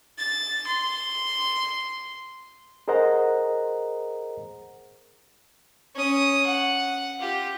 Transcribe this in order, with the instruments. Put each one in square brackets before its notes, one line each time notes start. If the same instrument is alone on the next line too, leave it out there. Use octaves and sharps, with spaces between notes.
[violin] A6
C6
[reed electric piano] G#4 A#4 C5 D#5 F#5 A#5
[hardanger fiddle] C#4 D#6
F#5
F4 G4